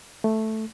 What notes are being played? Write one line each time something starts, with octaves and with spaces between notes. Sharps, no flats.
A3